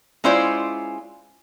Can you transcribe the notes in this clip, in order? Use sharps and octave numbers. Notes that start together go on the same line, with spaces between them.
G#3 C#4 E4 F4 C5 D5